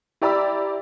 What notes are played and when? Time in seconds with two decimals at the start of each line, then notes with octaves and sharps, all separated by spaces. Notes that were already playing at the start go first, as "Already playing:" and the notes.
0.21 E4 G4 D5 A#5 B5 E6